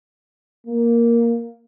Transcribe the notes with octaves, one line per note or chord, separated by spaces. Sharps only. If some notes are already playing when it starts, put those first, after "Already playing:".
A#3